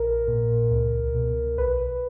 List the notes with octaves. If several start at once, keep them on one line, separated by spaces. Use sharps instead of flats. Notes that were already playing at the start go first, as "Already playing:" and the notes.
Already playing: A#1 A#4
A#2
C#2
B2
B1 B4